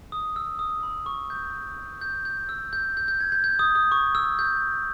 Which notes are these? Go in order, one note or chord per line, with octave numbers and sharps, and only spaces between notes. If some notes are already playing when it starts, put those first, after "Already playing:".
D#6
E6
D#6
B5
C#6
G6
G6
G6
E6
G6
G6
G6
G#6
G6
G6
D#6
D#6
C#6
E6
G6